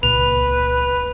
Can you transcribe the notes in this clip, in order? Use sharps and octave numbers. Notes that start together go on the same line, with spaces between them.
C#2 A#2 B4 F7